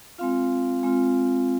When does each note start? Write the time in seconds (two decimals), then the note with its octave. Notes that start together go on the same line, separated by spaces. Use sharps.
0.18 G#3 C4 F4 F5
0.83 G#3 C4 F4